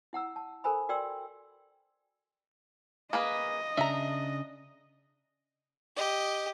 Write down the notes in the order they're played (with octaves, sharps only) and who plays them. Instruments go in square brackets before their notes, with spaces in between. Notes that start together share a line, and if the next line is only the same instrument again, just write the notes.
[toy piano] E4 F#5 A#5 E6
A5
A4 A#4 C5 G#5 A#5 B5
F#4 A#4 D5 G5 C6 E6
[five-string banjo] A#3 G#4 B4 [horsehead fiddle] D#5
[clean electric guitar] C#3 D4 [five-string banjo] E5 A#5
[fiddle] G4 D#5